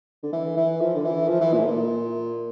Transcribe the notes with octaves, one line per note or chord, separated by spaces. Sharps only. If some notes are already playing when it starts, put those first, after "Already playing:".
D3
E3
E3
F3
D3
E3
F3
E3
A#2
A2
A#2